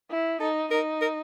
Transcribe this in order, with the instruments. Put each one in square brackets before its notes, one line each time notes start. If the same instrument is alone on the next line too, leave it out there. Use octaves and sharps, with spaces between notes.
[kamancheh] E4
[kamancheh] D#4 [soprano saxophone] A4
[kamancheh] D#4 [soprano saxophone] A#4
[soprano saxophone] A#4